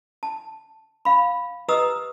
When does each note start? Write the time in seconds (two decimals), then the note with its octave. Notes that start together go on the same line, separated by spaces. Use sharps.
0.23 A5
1.05 F5 B5
1.68 G4 B4 D#5 A#5 D#6 E6